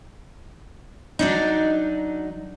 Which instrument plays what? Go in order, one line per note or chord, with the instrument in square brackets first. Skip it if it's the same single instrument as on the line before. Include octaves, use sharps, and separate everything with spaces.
[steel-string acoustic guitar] F#3 D4 D#4